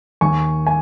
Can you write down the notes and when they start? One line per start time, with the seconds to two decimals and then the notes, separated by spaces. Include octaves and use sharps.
0.21 D#2 G#5 C#6
0.67 G#5